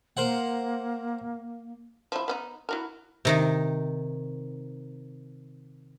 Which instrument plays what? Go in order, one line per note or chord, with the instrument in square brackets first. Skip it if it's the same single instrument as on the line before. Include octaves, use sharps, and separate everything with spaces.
[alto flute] A#3 [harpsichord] A#4 C5 F#5
[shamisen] F3 E4
B3 C4 D#4
E4 F#4 A#4
[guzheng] C3 D#3 D#4